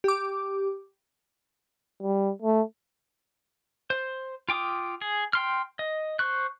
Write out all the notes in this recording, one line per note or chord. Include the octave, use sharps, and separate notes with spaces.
G4 D6
G3
A3
C5
F4 G5 D6 D#6
G#4
G5 C6 F6
D#5
C5 C#6 F#6